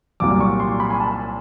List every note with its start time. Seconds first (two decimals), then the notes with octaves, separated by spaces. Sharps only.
0.20 C2 A#2 F#3 D6
0.41 C#6
0.60 C6
0.80 B5
0.90 G#5
1.00 A5